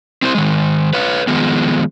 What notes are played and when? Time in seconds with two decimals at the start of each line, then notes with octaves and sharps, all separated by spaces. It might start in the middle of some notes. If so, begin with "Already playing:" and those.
0.22 C4 E4 G4 C5
0.35 D#3 G#3
0.93 B4 C#5 F5
1.27 D#3 F3 G#3 B3